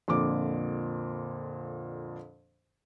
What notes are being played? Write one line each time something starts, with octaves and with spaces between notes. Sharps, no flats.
F2 A#2 D3 D6